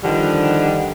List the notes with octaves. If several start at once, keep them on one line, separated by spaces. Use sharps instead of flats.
D3 D#3 F3 G3 D4